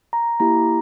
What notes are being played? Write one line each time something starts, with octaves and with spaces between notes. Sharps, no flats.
A#5
A#3 E4 G4 A#5